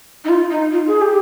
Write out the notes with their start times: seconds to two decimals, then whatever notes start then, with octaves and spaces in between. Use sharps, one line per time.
0.25 D#4
0.29 F4
0.51 D#4
0.72 F4
0.87 G#4
1.01 G4